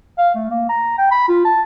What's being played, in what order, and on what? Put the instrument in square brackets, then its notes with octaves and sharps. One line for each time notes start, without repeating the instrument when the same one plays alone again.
[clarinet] F5
A3
A#3
A#5
G5
B5
F4
A5